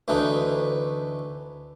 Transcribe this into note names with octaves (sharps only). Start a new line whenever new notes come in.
D2 E3 A3 D4 D#4